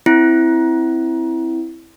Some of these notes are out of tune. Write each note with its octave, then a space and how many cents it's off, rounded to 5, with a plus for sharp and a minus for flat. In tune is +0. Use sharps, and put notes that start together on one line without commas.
C4 +0 E4 +0